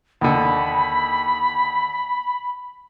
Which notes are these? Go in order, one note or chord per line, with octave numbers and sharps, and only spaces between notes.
D#2 D3 B5